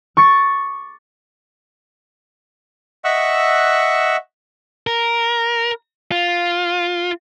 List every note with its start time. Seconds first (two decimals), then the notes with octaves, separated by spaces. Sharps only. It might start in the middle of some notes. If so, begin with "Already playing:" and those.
0.17 C#6 D6 A6 C#7
3.05 D#5 E5 F#5 C#6 E6 F#6
4.87 A#4
6.12 F4